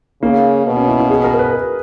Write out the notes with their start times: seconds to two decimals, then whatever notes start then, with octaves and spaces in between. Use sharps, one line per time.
0.22 C#3 A#3
0.66 B2
0.76 C#4
0.88 E4
0.99 E4
1.10 G#4
1.24 A#4
1.34 A#4
1.39 B4
1.53 A#4